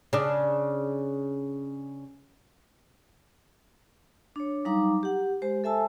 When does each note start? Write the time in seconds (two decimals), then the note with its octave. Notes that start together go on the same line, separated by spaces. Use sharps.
0.13 C#3 D4
4.36 D4 C#5
4.65 F#3 G3 D#4 F5 A#5 D6
5.03 G4 F#5
5.42 G#3 G4 C5
5.64 A4 E5 G#5 A5 E6